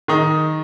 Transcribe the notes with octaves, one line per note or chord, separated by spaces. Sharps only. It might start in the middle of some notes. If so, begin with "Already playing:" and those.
D#3 D#4